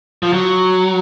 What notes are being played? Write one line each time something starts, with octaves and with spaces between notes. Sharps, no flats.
F3
F#3